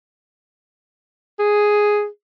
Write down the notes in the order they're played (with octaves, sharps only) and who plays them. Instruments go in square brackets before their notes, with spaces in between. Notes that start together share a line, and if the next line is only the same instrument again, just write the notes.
[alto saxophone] G#4